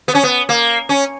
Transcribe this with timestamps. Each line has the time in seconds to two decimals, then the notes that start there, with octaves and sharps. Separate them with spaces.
0.08 B3
0.15 C#4
0.23 B3
0.49 A#3
0.89 C#4